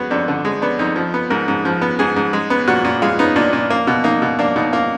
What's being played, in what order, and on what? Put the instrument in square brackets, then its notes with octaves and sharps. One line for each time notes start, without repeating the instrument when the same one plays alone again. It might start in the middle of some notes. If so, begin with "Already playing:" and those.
Already playing: [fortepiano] G#3 B3 F#4
F2 D4
D3
G#3
B3 D4
F2 D#4
F3
B3
G#2 A#4
G#2
F3
B3
G#2 G#4
G#2
G#3
B3
A#2 F#4
A#2
G#3 F4
B3 D#4
A#2 D4
A#2
A#3
B2
A#3 D#4
B2
A#3 D4
B2 D#4
A#3 F4